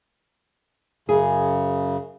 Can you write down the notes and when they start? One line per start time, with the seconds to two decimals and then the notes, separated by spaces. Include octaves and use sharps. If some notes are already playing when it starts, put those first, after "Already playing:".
1.09 F#2 C#3 G#4